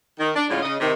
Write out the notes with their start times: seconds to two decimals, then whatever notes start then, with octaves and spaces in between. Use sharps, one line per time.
0.19 D#3
0.35 D4
0.48 A2 D3 G#3 C#4 F4
0.63 C#3 D#5
0.80 C3 D#3